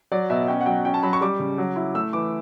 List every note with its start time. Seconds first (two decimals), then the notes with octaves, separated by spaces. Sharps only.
0.12 F#3 D5
0.30 B2 E5
0.48 C#4 G5
0.61 F#5
0.66 F#3 G5
0.85 C#4 G5
0.94 A5
1.03 F#3 B5
1.13 C#6
1.21 G3 D6
1.39 C#3
1.58 F#3
1.76 E4
1.95 A3 E6
2.13 E3 D6